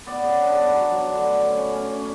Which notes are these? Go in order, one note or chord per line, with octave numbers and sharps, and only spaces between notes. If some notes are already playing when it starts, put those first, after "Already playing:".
B3 D5
C#3
D4
B3
F#3
F#3
D3
A3
C#4
C#4
C#4
C#4